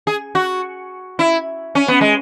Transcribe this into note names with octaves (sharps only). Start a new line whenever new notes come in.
G#4
F#4
E4
C#4
B3
G#3